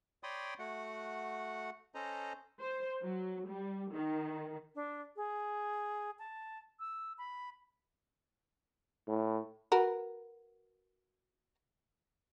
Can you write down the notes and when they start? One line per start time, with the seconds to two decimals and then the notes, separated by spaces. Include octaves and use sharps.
0.23 C#5 D5 G5 B5 C6 D#6
0.59 A3 F#4 F#5
1.95 C#4 A4 C5 D#5 A#5
2.61 C5
3.03 F#3
3.49 G3
3.92 D#3
4.75 D4
5.16 G#4
6.19 A5
6.80 E6
7.18 B5
9.08 A2
9.72 F#4 A#4 B4